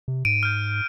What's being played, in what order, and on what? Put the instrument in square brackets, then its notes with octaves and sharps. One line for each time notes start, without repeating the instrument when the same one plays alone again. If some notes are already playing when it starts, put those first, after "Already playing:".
[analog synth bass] C3
[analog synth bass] G#2 [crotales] D7 D#7
[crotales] F6 G6